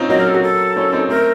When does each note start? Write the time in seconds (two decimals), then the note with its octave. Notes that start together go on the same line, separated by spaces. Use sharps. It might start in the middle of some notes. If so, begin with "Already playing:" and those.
Already playing: C4 C#4 D#4 F4
0.09 F#3 A#3 D#5
0.18 A#4
0.27 A4
0.35 F#4
0.43 A4
0.76 A#3 C#4
0.92 C4 D#4
1.09 A3 C4 A#4